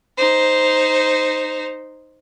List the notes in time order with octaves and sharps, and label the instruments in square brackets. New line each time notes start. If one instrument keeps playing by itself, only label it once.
[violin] D#4 C5